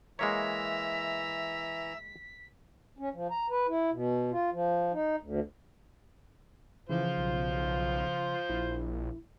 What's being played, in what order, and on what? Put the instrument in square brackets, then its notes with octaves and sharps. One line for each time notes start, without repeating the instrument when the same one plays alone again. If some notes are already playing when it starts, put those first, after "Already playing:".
[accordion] E3 A#5 [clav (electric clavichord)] G#3 A#3 C#5 [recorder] E5 [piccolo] B6
[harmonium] C#4
F3
A#5
B4
E4
B2
F4
F3
D#4
D2
[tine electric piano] C#3 F3 [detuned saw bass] E3 [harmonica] F4 C5
[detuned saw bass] B1
[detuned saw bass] A#1 [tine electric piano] E4